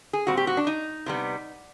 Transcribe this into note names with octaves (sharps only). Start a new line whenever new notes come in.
G#4
A#2 G3 C4 F#4
G4
F#4
D4
D#4
C3 E3 G3 B3